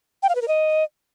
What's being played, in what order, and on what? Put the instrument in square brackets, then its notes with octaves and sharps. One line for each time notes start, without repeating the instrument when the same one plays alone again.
[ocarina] G5
F5
B4
A#4
D#5